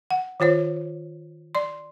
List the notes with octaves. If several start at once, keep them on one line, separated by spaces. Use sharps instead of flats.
F#5
D#3 F4 C5 C#5
D5 C6